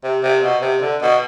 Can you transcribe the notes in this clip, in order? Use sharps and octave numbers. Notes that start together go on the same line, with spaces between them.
C3
C3
B2
C3
D3
B2